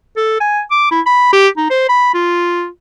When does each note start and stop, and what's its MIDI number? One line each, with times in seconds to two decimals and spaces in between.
0.17 0.35 69
0.40 0.61 80
0.71 0.91 86
0.91 1.01 64
1.06 1.32 83
1.33 1.48 67
1.57 1.68 63
1.70 1.87 72
1.89 2.11 83
2.14 2.67 65